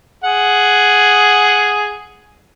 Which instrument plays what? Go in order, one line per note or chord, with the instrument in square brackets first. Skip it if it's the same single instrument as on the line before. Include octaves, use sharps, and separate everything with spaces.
[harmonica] G#4 F#5